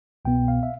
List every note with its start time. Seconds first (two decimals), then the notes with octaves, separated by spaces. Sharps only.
0.25 C2 B2 B3 G5
0.48 F5
0.63 E5